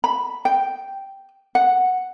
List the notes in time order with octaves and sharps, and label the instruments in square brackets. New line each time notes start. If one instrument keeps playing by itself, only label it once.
[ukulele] B5
G5
F#5